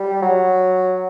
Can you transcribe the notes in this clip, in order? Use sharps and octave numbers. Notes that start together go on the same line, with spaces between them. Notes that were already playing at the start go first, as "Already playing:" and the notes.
Already playing: G3
F#3